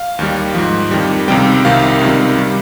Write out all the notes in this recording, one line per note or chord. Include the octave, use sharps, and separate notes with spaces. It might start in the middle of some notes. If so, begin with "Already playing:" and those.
Already playing: F5
D#2 D#3 G3
G#2 F3
F2 D#3 G3
C#2 C3 D#3 G3 G5
C2 C3 D#3 G3 F5
C#2 C3 D#3 G3
G3